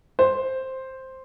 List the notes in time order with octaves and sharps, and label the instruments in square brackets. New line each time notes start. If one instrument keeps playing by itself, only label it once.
[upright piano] C5